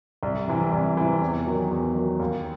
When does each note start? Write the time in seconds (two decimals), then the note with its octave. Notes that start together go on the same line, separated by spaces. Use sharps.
0.23 C2
0.48 C3 E3
0.73 C2
0.97 C3 E3
1.21 E2
1.47 D#3 F#3
1.71 E2
1.95 D#3 F#3
2.20 D#2